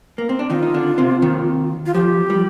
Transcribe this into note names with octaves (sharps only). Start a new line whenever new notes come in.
A#3
C4
D4
D#3 D#4 F4
D#4
D3 D4
C3 C4
D#2 D#3
F4
F2 F3 G4
G3